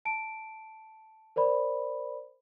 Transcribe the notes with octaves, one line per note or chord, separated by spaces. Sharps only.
A5 D7
A#4 C5 D5 B5